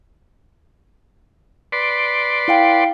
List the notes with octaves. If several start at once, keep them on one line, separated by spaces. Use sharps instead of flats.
B4 D5 C6
E4 F5 G5